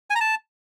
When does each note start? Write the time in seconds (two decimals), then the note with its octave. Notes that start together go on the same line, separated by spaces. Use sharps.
0.10 G#5
0.15 A#5
0.21 A5